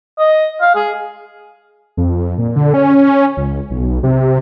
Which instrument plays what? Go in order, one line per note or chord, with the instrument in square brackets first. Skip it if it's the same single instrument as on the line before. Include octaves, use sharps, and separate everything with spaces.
[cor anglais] D#5
F5
G#4
[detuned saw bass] F2
A#2
D3
C#4
C#2
B1
C3